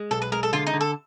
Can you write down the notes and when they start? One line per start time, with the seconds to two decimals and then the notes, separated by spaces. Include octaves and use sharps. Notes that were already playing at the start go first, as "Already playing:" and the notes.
Already playing: G#3
0.11 B1 A4
0.22 B4
0.32 G#3 A#4
0.43 A4
0.53 D3 F4
0.67 D#4
0.74 D3
0.81 A4